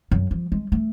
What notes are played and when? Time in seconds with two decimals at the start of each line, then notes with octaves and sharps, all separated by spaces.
0.11 F#2
0.31 F3
0.52 G#3
0.72 A3